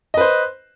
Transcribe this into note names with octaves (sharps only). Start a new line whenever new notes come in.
B4 C5 D#5